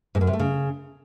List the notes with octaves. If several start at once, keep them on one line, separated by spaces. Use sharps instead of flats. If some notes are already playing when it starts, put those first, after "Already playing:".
G#2
F#2
C3
A3
C#3